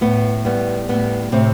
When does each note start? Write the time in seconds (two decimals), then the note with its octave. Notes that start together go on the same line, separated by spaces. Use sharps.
0.01 A2 B3
0.45 G3 B3
0.89 A2 B3
1.32 A2 C3 C4